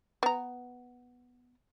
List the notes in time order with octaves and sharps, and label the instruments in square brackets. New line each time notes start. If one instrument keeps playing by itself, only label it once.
[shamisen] B3 A#5